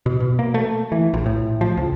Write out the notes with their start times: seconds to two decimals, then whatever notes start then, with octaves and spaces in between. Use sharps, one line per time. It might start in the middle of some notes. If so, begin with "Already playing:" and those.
0.06 B2
0.20 B2
0.39 A#3
0.54 A3
0.92 E3
1.14 A#1
1.26 A2
1.61 F3
1.77 C#2